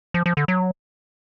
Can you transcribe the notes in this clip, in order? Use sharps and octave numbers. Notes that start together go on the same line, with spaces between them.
F3
F3
D3
F#3